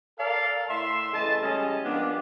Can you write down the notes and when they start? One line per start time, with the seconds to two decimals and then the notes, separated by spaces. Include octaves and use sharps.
0.19 A4 A#4 D5 F5
0.70 A2 E5 C6
1.13 C#3 E3 A3 D#5 A5
1.42 G3 G#3 C#4 D#5
1.85 F3 A#3 B3 D4 G4